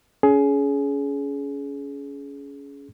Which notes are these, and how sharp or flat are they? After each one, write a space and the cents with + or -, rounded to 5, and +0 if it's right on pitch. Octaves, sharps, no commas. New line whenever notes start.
C#4 +25 G#4 +20